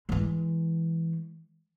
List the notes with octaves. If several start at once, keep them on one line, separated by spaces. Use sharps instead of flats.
E3 G#3